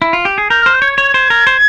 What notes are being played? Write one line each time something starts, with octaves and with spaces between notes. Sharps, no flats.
E4
F4
G4
G#4
A#4 G6
C5 F6
G6
C#5 G#6
C#5
C5
A#4
C5